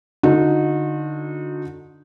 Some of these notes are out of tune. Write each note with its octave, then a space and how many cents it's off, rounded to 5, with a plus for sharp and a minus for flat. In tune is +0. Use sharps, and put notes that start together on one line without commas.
D3 +5 D#4 +0 F#4 -35